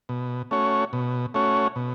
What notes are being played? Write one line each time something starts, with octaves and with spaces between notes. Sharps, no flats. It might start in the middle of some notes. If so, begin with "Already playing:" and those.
B2
A3 C#4 F#4 C#5
B2
A3 C#4 F#4 C#5
B2